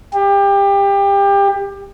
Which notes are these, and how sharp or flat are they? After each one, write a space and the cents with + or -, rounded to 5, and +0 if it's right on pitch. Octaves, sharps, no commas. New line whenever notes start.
G4 +25